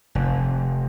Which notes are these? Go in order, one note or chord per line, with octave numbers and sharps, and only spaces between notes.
F1